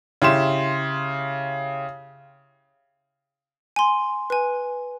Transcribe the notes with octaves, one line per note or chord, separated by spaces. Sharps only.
C#3 E4 G4 C6 E7
G#5 C6
B4 G#5